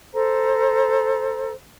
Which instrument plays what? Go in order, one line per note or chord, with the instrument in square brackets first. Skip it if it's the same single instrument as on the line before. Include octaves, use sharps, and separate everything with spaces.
[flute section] A4 C5 A#5